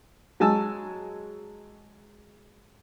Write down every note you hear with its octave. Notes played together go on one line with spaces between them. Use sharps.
F#3 G#3 G#5 A5 E6